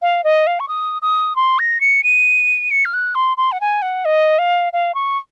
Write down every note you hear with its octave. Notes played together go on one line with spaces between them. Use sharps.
F5
D#5
F5
C#6
D#6
D#6
C6
A#6
C#7
D#7
C#7
F6
F#6
C6
C6
F#5
G#5
F#5
D#5
F5
F5
C#6